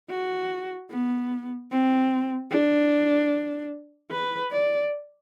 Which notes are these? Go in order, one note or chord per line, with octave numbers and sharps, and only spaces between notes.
F#4
B3
C4
D4
B4
D5